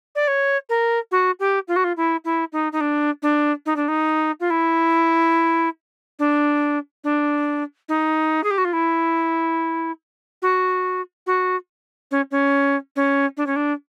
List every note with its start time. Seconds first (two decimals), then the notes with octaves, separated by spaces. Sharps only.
0.15 D5
0.28 C#5
0.69 A#4
1.11 F#4
1.40 G4
1.68 F4
1.76 F#4
1.84 F4
1.97 E4
2.25 E4
2.52 D#4
2.72 D#4
2.81 D4
3.22 D4
3.66 D#4
3.76 D4
3.88 D#4
4.40 F4
4.50 E4
6.19 D4
7.04 D4
7.89 D#4
8.44 G#4
8.51 G4
8.58 F#4
8.65 F4
8.73 E4
10.42 F#4
11.27 F#4
12.11 C#4
12.31 C#4
12.96 C#4
13.37 D4
13.47 C#4
13.56 D4